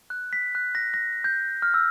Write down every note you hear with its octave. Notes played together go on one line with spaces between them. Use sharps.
F#6
B6
F#6
A#6
A#6
G6
F6
E6